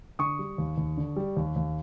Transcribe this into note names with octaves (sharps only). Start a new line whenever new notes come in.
D3 C#6 D#6
G3
D#2
D#2
D3
G3
D#2
D#2